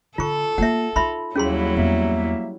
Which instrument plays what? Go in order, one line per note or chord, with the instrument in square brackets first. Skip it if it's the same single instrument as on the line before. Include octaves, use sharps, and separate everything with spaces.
[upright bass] D3 [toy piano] F4 C#6 [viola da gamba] A4
[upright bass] A#3 F4 [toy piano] E5 F#5
[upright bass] D#4 F4 [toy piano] E5 B5 C6
[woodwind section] D#2 B5 [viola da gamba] F#3 G3 E4 [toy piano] C#4 G#4 C6
[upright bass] E2 [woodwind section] A#3 E5